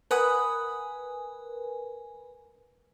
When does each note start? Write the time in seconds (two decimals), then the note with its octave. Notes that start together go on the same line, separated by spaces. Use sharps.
0.11 A#4 B4 F#5 G#5 B5 D#6